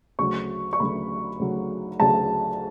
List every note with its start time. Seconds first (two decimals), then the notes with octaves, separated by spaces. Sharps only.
0.19 D2 C#3 F#3 C#6
0.73 C#6
0.80 D2 C#3 F#3 B5
1.39 D2 C#3 F#3
2.00 D2 C#3 F#3 A5